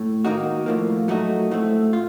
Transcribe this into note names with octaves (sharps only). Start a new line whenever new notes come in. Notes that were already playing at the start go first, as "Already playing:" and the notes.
Already playing: A2
D#3 A#3 D#4 F#4
A2 F3 A#3
F#3 A3 D#4 F#4
A2 A3 C4
F4